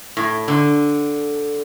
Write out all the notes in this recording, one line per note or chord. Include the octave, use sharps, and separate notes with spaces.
A2
D3